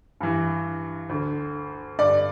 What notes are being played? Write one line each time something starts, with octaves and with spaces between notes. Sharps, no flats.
G2 E3
D2 D3
G2 D3 D5